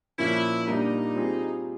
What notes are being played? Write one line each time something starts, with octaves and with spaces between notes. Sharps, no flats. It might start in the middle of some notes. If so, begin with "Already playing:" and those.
A#2 F3 A#3 C#4 E4
A#2 G3 A#3 D4 D#4
G3 C4 F4 G#4